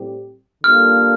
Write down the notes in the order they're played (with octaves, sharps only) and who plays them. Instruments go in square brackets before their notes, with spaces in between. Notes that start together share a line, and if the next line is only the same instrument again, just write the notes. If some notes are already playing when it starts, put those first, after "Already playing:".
Already playing: [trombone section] A2 G3 C4 G4
[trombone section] D3 G3 A#3 F4 A4 [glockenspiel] F6